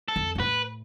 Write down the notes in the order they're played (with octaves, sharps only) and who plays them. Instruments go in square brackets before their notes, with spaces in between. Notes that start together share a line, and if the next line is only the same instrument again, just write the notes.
[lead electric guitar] A4
[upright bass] F2
G2
[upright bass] A2 [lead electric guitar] B4